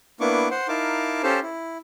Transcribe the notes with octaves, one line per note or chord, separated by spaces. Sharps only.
A#3 B3 D4 E4 C#6 D6
C5 F#5 C6
D#4 E4 A#4 F5 A5 D6
C#4 G4 A4 C5 F5 A5
E4